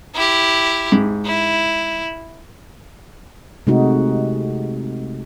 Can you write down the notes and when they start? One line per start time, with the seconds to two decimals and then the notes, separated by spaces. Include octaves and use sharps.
0.15 E4 G4
0.92 G#2
1.26 E4
3.67 C3 G#3 A3 D#4 F#4